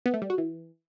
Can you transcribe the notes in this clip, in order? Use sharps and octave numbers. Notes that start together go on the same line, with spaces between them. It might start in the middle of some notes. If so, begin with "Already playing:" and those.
B3
A3
G3
F#4
E3